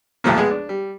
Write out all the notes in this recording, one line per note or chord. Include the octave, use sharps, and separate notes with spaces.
B1 F2 C3 F3 A3 A#3
G#3 B3 G#4
D4
G3